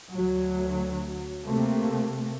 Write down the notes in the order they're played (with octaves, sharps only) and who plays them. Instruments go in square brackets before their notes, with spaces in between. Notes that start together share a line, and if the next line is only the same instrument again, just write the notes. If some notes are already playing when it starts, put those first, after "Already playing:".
[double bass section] D2 F#3
C3 A3 A#3